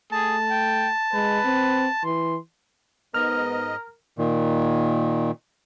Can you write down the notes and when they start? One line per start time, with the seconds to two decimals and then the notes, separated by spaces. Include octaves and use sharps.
0.12 A3 G#4 A5
0.51 G5
1.13 G#3 B4
1.45 C4
2.04 E3 C6
3.14 G#2 B3 A#4 D#5 F6
4.18 A#2 D#3